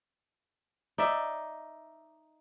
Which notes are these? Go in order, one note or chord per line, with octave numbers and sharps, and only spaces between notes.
D#4 D5 E5